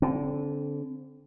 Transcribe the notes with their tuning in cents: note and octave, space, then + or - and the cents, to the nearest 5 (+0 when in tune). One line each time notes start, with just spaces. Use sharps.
D3 -25 C4 +0